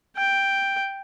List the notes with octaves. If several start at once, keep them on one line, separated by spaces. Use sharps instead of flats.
G5